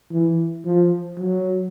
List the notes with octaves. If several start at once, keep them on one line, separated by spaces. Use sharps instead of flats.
E3
F3
F#3